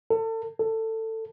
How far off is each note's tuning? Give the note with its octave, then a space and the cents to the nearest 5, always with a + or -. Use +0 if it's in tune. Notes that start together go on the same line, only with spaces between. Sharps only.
A4 +35
A4 +20